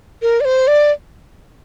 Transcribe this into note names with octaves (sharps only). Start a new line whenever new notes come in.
A#4
D5
C5
D5